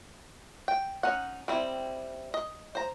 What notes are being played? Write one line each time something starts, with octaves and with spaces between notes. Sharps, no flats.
G5
C#4 D#4 F#5
G3 C4 E4
D#5
C5 A#5